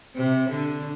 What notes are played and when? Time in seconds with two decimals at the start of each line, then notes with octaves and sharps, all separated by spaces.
0.16 C3
0.50 D3